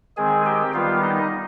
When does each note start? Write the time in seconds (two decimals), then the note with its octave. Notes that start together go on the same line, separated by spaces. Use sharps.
0.17 D#3 G#3 C4 G#4 G#5
0.45 G4 G5
0.73 D#3 G3 B3 F4 F5
1.02 D#4 D#5